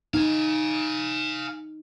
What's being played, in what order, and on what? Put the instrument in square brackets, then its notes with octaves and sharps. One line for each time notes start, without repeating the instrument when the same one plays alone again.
[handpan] D#4 [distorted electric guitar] F5 G#5